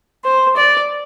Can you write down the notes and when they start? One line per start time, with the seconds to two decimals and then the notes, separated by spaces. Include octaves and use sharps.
0.25 C5
0.56 D5